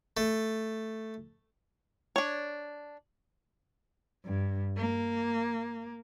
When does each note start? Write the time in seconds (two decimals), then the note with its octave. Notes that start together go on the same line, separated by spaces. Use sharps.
0.17 A3
2.16 D4 C#5
4.25 G2
4.77 A#3